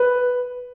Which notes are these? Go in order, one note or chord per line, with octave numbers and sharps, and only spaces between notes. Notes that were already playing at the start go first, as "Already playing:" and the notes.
Already playing: B4